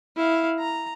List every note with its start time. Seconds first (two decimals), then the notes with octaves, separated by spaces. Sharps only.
0.16 E4 F5
0.59 A#5